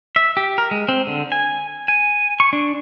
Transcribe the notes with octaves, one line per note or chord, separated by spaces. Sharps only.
E5
G4
A#4
G#3
C4
D3
G#5
G#5
C#6
D4